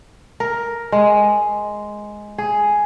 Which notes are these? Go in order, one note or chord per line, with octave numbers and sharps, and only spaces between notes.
A#4
G#3
G#4